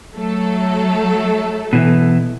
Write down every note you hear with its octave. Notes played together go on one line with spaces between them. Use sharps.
F#3 A3 A4
B2 E3